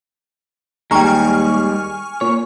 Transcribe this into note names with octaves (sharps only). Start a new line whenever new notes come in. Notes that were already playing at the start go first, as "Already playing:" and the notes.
D#2 G3 G#3 G5 G#5 A#5 C#6 F6
A#2 C#5